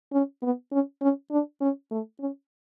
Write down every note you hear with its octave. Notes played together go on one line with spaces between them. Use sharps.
C#4
B3
C#4
C#4
D4
C#4
A3
C#4